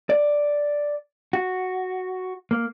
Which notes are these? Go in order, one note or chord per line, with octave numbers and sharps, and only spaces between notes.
D5
F#4
A#3